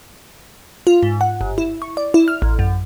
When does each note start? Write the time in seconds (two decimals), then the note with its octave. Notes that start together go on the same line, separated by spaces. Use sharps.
0.87 F4
1.03 G#2
1.21 F#5
1.41 G1
1.58 E4
1.82 C#6
1.97 D5
2.14 E4
2.28 F6
2.42 A1
2.59 F#2